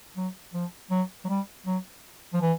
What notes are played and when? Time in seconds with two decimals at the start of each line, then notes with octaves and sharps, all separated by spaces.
0.16 F#3
0.53 F3
0.90 F#3
1.24 F#3
1.28 G3
1.66 F#3
2.33 F3
2.41 E3